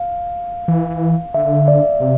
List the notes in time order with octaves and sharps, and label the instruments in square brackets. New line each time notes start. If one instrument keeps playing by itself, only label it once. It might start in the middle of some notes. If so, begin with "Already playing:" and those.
Already playing: [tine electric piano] F5
[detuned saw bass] E3
[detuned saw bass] D3 [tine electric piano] E5
[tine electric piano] D5
[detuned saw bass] C3